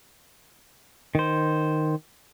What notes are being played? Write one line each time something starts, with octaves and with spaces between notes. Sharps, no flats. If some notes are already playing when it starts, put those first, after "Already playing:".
D#3 C5